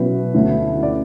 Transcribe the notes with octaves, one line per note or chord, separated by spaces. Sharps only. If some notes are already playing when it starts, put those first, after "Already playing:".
Already playing: B2 F#3 C#4 E4 B4
D2 D3 A3 C#4 E4
D5